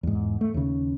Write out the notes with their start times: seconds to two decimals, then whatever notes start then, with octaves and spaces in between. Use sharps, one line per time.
0.03 E2 G#2
0.41 A3
0.54 D#2 C#3